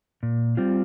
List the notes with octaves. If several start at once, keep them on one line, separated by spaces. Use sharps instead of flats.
A#2
G3 C4 F4